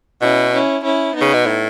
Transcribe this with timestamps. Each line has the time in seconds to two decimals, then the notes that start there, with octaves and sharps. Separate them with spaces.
0.22 B2 C#4 E4
0.53 C#4 E4
0.84 C#4 E4
1.15 B3 D#4
1.21 C#3
1.33 B2
1.46 A2